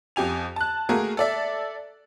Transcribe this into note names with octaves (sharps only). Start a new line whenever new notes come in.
F2 G4 G#5 F7
A5 F#6
A3 A#3 F#4 G#4 A#4
A4 D5 E5